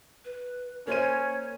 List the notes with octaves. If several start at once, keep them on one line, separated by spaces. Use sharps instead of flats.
B4
A#3 C#4 C5 C#5 D#7